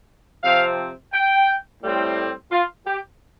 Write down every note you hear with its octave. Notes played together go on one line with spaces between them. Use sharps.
C3 F3 C4 F5
G5
A2 G3 C4
F4
G4